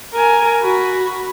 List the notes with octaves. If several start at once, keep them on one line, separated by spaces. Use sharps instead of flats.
A#4 G#5
F#4 B5